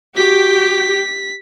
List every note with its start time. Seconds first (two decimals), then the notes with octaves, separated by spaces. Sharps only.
0.16 F#4 G4 B6